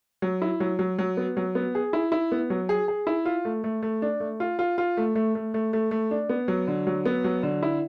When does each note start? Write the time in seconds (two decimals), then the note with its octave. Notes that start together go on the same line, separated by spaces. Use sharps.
0.22 F#3
0.42 E4
0.60 F#3
0.79 F#3
0.99 F#3
1.17 B3
1.37 F#3
1.55 B3
1.75 G#4
1.93 E4
2.12 E4
2.32 B3
2.50 F#3
2.69 G#4
2.88 G#4
3.07 E4
3.26 F4
3.45 A3
3.64 A3
3.82 A3
4.02 D4
4.20 A3
4.40 F4
4.59 F4
4.78 F4
4.97 A3
5.15 A3
5.35 A3
5.54 A3
5.73 A3
5.91 A3
6.11 D4
6.29 B3
6.48 F#3
6.68 D3
6.87 F#3
7.06 B3
7.24 F#3
7.43 D3
7.63 E4